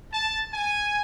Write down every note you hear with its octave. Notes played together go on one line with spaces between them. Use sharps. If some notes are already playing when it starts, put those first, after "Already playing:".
A5
G#5